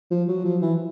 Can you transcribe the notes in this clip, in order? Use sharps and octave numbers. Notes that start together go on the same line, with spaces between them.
F3
F#3
F3
E3